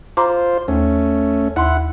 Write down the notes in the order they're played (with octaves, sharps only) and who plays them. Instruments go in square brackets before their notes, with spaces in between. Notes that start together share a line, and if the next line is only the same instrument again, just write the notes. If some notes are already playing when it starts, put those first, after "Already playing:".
[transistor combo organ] F4 C5 [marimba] A#5 C6 D6
[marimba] D#2 [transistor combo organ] A3 C#4
[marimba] D#2 C6 [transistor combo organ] E4 F#5